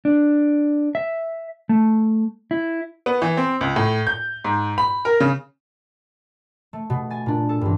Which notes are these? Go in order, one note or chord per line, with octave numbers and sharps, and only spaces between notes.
D4
E5
A3
E4
B3
E3
C4
C#2
A2
G6
G#2
B5
A#4
C#3
A3
B2
G#5 A6
A#2 D4
A4
A1 G2